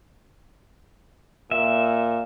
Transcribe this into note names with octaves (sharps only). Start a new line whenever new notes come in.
A#2 E5